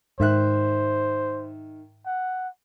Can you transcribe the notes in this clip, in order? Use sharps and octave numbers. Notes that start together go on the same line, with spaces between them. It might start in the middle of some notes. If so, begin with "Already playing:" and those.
G#2 D#3 C5 E5 F#6
F#5